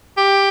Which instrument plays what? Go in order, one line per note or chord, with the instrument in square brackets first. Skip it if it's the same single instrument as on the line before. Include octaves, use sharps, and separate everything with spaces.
[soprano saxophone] G4